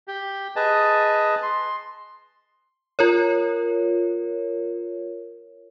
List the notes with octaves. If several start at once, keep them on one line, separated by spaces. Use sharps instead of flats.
G4
G#4 B4 D#5 A5
C6
F4 A#4 C#5